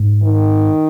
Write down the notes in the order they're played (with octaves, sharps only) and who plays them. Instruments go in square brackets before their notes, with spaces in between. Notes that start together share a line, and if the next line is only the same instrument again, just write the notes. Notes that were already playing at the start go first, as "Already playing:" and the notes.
Already playing: [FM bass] G#2
[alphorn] D#3